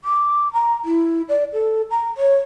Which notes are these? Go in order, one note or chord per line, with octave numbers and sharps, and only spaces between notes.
D6
A#5
E4
D5
A4
A#5
C#5